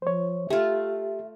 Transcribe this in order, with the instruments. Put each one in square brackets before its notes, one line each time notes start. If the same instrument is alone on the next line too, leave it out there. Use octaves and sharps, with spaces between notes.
[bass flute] F3 [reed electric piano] C5 C#5
[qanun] A3 F4 [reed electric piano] G4 [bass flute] E5